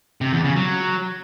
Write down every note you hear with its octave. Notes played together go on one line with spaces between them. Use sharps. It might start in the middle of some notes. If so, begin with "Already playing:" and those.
C3
E2
C#3
F#3